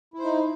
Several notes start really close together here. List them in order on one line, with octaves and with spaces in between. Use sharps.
E4 C5 D#4